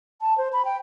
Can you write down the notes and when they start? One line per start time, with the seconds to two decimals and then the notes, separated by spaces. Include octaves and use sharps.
0.21 A5
0.38 C5
0.53 B5
0.65 G5